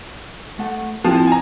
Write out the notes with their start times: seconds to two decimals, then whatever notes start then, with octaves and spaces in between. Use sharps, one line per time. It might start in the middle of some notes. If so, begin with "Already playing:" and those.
0.59 A3 F#5
1.05 F3 C4 E4
1.27 G#5 A#5